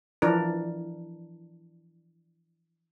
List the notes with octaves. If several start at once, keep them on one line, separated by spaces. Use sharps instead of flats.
E3 F3 D4 A#4